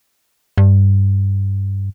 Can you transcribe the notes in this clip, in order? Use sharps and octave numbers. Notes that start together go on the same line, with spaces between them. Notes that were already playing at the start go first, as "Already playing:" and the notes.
G2